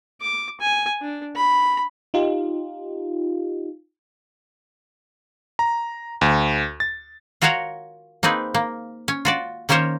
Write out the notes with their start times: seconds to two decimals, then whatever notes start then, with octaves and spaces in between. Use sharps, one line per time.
0.21 D6
0.60 G#5
1.02 D4
1.35 B5
2.14 D#4 F4 G4
5.59 A#5
6.21 D2
6.80 A6
7.42 F4 F#4 A#4 C#5 F5 F#5
8.23 A#3 C4 D#4 G#4 B4
8.54 A#3
9.08 C#4
9.25 F4 F#4 D5
9.69 D#3 A#3 C#4 A#4 C5 C#5